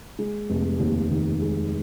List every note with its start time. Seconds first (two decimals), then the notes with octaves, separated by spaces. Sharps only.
0.19 G#3
0.50 F1
0.80 D#2
1.10 D#3
1.41 G#3